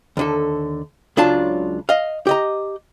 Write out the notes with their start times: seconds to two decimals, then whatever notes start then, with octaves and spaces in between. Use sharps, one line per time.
0.17 D#2 D3 A4
1.17 C#2 F#3 D4 F4 A5
1.89 D#5 F5
2.27 G4 D#5 A#5